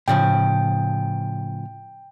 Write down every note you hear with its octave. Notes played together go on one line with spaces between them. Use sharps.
A2 C#3 F3 G5